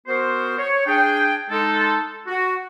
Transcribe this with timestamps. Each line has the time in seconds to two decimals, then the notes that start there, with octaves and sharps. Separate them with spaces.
0.07 B3 F#4 A#4 C5
0.58 C#5
0.86 D4 G#4 G5
1.50 G#3 D#4 A4
2.27 F#4